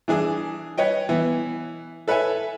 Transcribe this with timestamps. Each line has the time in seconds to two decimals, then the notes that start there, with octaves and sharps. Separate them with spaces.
0.08 E3 D4 G#4 D#6
0.78 B4 C#5 D#5 G5
1.09 E3 B3
2.08 A4 B4 C#5 E5 G#5